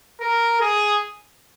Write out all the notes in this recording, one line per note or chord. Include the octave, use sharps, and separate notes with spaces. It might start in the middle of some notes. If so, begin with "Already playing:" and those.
A#4
G#4